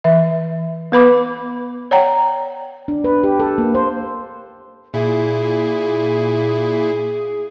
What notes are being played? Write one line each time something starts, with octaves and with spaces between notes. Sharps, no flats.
E3 E5
B3 B4 B5 D6
C#5 D5 F#5 G5 A#5
D4
B4
G4
A4
A#3
C5
A#2 E4 G#4